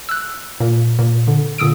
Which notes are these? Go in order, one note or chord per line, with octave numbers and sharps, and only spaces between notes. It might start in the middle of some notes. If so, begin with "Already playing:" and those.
E6 F#6
A#2
A#2
D3
A#2 D3 D#6 E6 D7